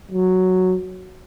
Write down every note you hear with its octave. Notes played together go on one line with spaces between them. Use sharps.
F#3